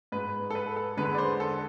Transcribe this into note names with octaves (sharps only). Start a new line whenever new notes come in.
G#2 G#3 B4
A4
B4
A4
E2 D3 G#3 B4
D5
C5
A4